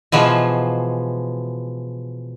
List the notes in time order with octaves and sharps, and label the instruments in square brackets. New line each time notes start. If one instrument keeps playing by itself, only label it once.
[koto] B2 E3 F3 G#3